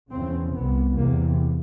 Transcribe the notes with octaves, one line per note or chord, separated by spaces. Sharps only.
E2 C#3 C4
C2 C3 B3
E2 C3 A#3